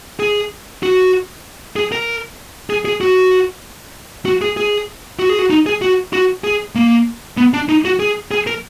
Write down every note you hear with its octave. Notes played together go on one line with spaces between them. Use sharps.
G#4
F#4
G#4
A#4
G#4
G#4
F#4
F#4
G#4
G#4
F#4
G#4
F#4
D#4
G#4
F#4
F#4
G#4
A#3
B3
D4
D#4
F#4
G#4
G#4
A#4